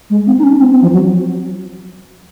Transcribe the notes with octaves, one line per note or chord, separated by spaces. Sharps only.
G#3
C4
D#4
C#4
C4
C4
F3
F#3